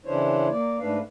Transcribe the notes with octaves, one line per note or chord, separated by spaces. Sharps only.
C#3 E3 D4 E4 C5 C#5
A#3 D5
G#2 A3 D4 B4 F5